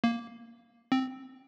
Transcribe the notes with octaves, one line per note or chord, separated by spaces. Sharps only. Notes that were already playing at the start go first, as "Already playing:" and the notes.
A#3
C4